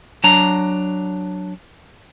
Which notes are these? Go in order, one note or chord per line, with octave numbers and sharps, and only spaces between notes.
F#3 D4 A#5